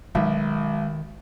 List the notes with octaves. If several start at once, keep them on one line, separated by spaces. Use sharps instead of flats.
B1 D#3 G#3 E5